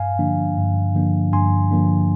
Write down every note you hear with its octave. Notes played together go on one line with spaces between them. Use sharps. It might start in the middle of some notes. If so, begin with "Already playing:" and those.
Already playing: G2 F5 G#5
D3 F3 A#3 D4
G2
D3 F3 A#3 D4
G2 G#5 C6
D3 F3 A#3 D4